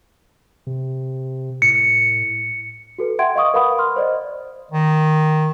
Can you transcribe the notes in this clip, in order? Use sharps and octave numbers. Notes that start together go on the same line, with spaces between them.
C3
A2 C#7
F#4 A4 B4
E5 F#5 G5 C6 G#6 D7
D#5 F5 C#6 D#6
A#4 B4 F5 F#5 B5 D#6
C6 F6
C5 D5 D#5
D#3